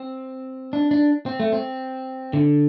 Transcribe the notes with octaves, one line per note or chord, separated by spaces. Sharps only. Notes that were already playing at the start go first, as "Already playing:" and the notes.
Already playing: C4
D4
D4
C4
A3
C4
D3